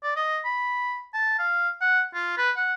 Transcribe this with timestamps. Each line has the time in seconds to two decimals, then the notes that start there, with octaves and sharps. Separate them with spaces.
0.03 D5
0.16 D#5
0.44 B5
1.14 A5
1.39 F5
1.81 F#5
2.15 F4
2.38 B4
2.56 F#5